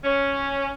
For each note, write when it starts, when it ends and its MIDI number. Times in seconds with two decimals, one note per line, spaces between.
0.04 0.72 61